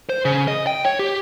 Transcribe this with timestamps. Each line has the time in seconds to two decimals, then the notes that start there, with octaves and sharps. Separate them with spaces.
0.09 C5
0.25 C#3
0.48 D#5
0.67 G5
0.85 C#5
0.99 G4